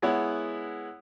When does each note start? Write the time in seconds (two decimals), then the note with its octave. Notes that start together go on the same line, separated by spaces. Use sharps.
0.02 G#3 B3 E4 C#5 F#5